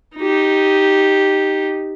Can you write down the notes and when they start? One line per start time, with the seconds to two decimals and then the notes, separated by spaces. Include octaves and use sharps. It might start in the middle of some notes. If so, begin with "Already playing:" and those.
0.17 D#4 G4